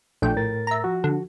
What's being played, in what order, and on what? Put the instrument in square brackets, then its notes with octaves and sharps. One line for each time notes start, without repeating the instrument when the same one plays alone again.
[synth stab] A#1 G5 [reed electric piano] A3 D4 A4
[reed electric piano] A2 A#4 A6
[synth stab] E5 A#5
[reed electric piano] F3 F#4
[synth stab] D3